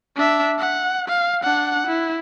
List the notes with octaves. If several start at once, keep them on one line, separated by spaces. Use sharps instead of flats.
D4 E5
F#5
F5
D4 F#5
E4